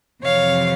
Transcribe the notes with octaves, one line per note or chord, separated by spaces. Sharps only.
F2 C3 E3 C#5 F5